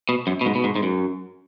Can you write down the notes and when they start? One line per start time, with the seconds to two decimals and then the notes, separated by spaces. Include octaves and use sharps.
0.09 B2
0.27 F#2
0.41 B2
0.46 G#2
0.55 B2
0.64 G#2
0.76 G#2
0.83 F#2